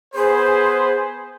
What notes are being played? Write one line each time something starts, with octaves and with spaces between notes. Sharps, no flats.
B3 G#4 B4 C5